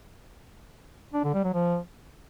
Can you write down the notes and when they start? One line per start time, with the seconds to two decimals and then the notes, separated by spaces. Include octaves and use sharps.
1.14 D4
1.24 D3
1.34 G3
1.44 F#3
1.54 F3